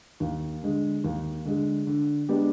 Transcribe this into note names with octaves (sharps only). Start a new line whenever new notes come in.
D#2
D3 G#3
D#2
D3 G#3
D3
G#3 B3 D4 G4